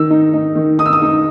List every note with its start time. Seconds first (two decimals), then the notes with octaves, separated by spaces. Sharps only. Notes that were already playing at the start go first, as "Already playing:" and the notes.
Already playing: D#3 E6
0.10 D#4
0.34 D#4
0.55 D#3
0.79 D#4 D#6
0.86 E6
0.93 D#6
1.02 D#4